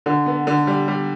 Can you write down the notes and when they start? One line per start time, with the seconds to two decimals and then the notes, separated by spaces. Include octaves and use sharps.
0.06 D3
0.26 B3
0.47 D3
0.67 G3
0.88 G3